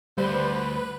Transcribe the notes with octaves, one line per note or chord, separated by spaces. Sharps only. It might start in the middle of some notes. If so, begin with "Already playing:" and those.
D2 G3 B4 C5